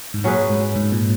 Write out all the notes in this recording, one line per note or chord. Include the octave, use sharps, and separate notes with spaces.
G#2
A#2 F#3 C#4 G#4 B4
G#2
G#2
A#2